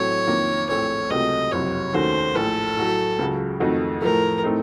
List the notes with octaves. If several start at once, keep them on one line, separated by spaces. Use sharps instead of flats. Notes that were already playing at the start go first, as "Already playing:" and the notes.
Already playing: A1 A2 F#3 A3 C4 C#5
F2 D#3 A#3 F4
A#1 A2 A3 C4 C#5
C#2 C3 F#3 A3 C4 D#5
F#1 F2 C3 F#3 C#5
D#2 D#3 A3 C#4 F#4 C5
A#1 A2 A3 A4
A2 F#3 A3
C#2 C#3 F#3
F2 D#3 A3 D#4 F#4
A2 F3 A3 A#4
A2 A3 C4 D#4